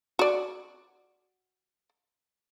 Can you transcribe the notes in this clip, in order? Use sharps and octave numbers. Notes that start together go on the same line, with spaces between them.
F#4 D5